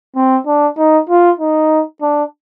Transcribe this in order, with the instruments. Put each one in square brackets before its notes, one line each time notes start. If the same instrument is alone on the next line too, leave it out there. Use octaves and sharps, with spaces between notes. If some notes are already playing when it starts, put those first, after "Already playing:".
[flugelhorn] C4
D4
D#4
F4
D#4
D4